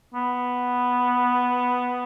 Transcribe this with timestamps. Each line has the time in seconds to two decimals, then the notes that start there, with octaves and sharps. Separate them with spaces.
0.14 B3